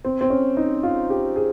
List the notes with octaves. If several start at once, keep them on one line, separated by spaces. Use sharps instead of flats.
C4
C4
C#4
D#4
F4
G4
G#4